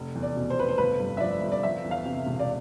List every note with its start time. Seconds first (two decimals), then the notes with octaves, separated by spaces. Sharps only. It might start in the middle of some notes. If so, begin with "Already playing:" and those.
Already playing: F1
0.15 E2
0.22 D5
0.36 B2
0.50 C5
0.58 F1 B4
0.69 C5
0.78 G1 B4
1.00 G2
1.17 E5
1.20 F3 D5
1.42 G1
1.52 D5
1.63 F3 E5
1.84 E2
1.91 F5
2.05 C3
2.27 E1
2.39 D5